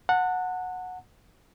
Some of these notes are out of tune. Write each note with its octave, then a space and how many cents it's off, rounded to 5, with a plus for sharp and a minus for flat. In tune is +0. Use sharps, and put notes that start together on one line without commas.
F#5 -15 A5 +35